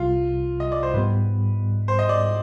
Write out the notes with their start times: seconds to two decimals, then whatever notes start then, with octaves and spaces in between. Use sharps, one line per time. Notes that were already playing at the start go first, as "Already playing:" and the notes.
Already playing: C2 C3 G3 F4
0.60 D#5
0.72 D5
0.83 C5
0.94 G#2 G3 B3 B4
1.88 C5
1.99 D#5
2.09 D5